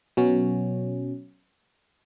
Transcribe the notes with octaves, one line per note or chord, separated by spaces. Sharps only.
B2 F#3 C#4